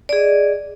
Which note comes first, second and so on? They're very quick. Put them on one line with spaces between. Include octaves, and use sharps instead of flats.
D5 G#4 D#5